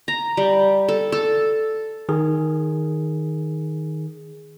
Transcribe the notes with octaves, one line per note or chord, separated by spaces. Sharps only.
A#5
G3
A4
A4
D#3 G#4